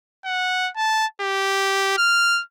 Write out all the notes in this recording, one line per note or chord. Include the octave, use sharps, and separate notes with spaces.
F#5
A5
G4
F6